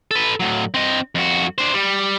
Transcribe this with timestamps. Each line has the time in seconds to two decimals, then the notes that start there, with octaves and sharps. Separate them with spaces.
0.11 A4 B4
0.40 A2 F#3
0.74 C4 D#5
1.15 F2 F#4
1.58 D4 C5
1.74 G3